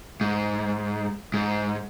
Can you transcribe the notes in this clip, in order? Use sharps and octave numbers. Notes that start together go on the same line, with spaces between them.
G#2
G#2